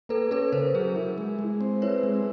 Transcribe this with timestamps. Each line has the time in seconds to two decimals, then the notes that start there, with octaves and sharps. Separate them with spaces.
0.09 A#3 A4 B4
0.31 C#4 A4 B4
0.52 C#3 A#4 C5
0.74 F#3 G#4 A#4
0.96 E4
1.18 G#3
1.39 G#3
1.61 C4
1.82 E4 B4 C#5
2.03 G#3